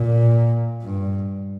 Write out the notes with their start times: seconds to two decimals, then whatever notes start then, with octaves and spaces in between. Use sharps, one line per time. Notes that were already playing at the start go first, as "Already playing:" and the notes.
Already playing: A#2
0.83 G2